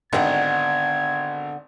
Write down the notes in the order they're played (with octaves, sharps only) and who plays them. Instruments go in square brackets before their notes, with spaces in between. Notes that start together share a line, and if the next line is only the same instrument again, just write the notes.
[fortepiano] G#1 D#3 [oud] D3 B3 D4 [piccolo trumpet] G#6